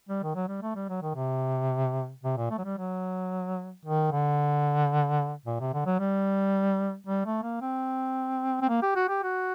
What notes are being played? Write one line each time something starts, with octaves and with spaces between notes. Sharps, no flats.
G3
D#3
F#3
G3
A3
G3
F#3
D#3
C3
C3
A#2
A3
F#3
G3
F#3
D#3
D3
A#2
C3
D3
F#3
G3
G3
A3
A#3
C4
C4
A#3
G4
F#4
G4
F#4